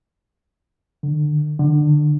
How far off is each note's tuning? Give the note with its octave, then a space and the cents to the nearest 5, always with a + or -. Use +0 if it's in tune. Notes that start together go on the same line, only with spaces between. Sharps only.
D3 +30
D3 +25